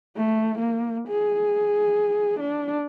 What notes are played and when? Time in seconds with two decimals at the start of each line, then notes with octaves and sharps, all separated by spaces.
0.16 A3
0.59 A#3
1.08 G#4
2.40 D4